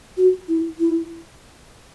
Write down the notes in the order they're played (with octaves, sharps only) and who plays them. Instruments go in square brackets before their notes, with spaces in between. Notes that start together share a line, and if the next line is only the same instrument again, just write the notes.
[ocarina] F#4
E4
E4